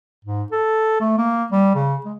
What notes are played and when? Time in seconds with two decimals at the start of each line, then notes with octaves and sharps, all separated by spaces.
0.25 G#2
0.52 A4
1.01 A3
1.18 A#3
1.52 G3
1.75 C#3
2.05 G#3